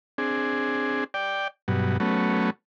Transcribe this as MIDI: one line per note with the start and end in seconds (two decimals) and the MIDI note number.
0.18 1.04 60
0.18 1.04 62
0.18 1.04 68
1.14 1.48 74
1.14 1.48 79
1.68 1.97 43
1.68 1.97 47
1.68 1.97 54
2.00 2.50 54
2.00 2.50 57
2.00 2.50 59
2.00 2.50 61